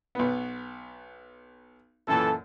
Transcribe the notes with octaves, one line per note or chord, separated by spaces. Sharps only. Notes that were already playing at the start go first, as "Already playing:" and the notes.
B1 B3
F#2 A#2 E3 A4